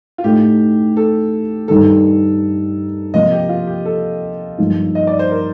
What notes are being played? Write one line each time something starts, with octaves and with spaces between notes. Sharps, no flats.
F4
A2 A3 D#4 G4
A4
G2 D#3 G3 A4
C3 F3 A#3 D#5
G4
F4
G4
A4
G2 F3 A#3 D#4
D#5
D5
C5
A#4